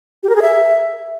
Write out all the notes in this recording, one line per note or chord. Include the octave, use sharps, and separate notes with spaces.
G4
A#4
G#4
E5